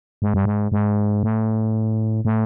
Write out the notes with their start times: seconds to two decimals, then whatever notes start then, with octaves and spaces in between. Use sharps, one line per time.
0.22 G#2
0.34 G2
0.45 G#2
0.72 G#2
1.23 A2
2.25 A2